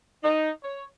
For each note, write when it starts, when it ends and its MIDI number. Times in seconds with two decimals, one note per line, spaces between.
0.23 0.50 63
0.63 0.84 73